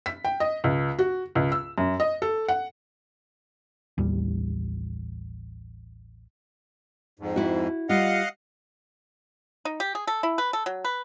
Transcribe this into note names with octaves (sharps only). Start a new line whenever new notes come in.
B6
G5
D#5
C#2
F#4
C#2
E6
F#2
D#5
A4
F#5
A1 D#2 G3
F2 G#2
E4 F#4
G3 F4 D#5 F5 F#5
D#4
G4
G#4
A4
E4
B4
A4
F#3
B4